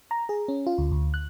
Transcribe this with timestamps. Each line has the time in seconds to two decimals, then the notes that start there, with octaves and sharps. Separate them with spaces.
0.11 A#5
0.29 G#4
0.48 C#4
0.66 F4
0.78 D2
0.92 D2
1.14 F#6